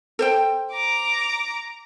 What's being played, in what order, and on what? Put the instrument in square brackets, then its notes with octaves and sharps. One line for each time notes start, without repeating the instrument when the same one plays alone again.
[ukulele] A4 C5 G5
[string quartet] A#5 D6